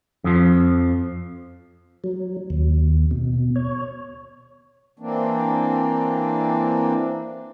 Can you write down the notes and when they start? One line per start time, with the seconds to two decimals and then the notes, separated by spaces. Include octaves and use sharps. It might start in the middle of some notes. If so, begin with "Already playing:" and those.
0.24 F2 F3
2.04 F#3
2.50 D#2
3.11 B2
3.56 C#5
4.99 E3 A#3 C4 D4